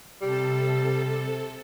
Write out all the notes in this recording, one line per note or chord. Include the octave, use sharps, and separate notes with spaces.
C3 G3 A4